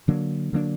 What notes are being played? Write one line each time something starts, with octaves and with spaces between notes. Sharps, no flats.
D3 F#3 A#3 D4
D3 F#3 A#3 D4